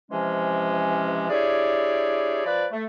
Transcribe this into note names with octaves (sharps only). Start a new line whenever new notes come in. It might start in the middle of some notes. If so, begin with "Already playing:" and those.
C3 E3 F3 G#3 C#4
D4 E4 G4 G#4 C#5 D5
F3 B4 D5
A3